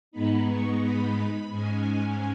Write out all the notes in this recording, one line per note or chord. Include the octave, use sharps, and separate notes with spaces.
G#2 G#3 B3 D#4 B5
C#6
B5
B5
G#2 G#3 C#4 G#5